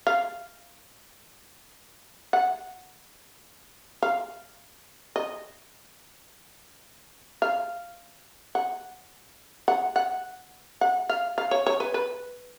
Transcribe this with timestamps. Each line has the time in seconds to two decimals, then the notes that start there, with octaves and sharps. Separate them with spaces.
0.07 F5
2.33 F#5
4.03 F5
5.16 D#5
7.42 F5
8.55 F#5
9.68 F#5
9.96 F#5
10.81 F#5
11.09 F5
11.38 F5
11.51 C#5
11.66 C#5
11.80 B4
11.94 B4